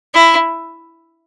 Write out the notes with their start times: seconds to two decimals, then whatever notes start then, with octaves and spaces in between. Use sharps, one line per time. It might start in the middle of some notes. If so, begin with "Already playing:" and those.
0.14 E4